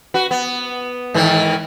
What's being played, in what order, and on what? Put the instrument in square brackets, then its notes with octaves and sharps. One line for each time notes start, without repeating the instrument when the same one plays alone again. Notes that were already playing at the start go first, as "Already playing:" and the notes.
[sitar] F#4 B4
B3
G#2 D#3 E3